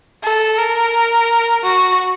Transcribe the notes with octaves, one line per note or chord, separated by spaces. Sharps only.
A4
A#4
F#4